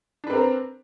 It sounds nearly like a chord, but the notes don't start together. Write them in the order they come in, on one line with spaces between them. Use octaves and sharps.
D4 B4 C4 A#4